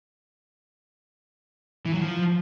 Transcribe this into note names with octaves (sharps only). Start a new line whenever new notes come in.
E3
F#3
F3